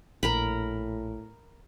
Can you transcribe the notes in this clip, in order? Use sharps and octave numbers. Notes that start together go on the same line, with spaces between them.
A#1 A2 A#4 A#5 B5